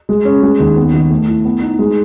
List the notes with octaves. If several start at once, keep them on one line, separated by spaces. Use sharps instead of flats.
G#3
C#4
G#3
D#2
B3
D#3
A3
E4
B3
D#4
G#3